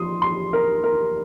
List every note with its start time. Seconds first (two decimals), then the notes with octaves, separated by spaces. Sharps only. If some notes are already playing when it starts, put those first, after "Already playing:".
Already playing: F3 C6 D#6
0.22 C6
0.53 A#4
0.84 A#4